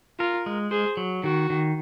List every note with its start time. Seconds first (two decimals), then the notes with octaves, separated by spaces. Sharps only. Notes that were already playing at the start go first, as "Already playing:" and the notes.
0.20 F4 A#4
0.46 G#3
0.71 G#4 C5
0.97 F#3
1.24 D#3 F#4
1.50 D#3